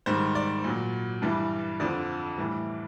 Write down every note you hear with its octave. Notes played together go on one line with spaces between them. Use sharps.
G#2 D#3 G3 C5
D5
A#2 F#3
G2 E3 G3
F2 D3 F3 D5
A2 E3 G3